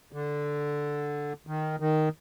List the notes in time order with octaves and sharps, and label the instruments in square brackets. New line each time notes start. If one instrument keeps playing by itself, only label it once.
[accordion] D3
D#3
D#3